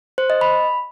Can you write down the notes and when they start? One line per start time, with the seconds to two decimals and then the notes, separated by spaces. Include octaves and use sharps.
0.18 C5
0.30 D#5
0.41 B5